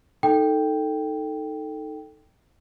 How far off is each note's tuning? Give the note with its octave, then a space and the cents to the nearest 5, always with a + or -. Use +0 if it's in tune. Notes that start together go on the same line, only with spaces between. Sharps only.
D#4 +0 A4 +5 G5 +0